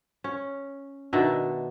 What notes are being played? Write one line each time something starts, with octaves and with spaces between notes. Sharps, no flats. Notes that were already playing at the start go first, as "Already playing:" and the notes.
C#4
B2 D#3 D4 E5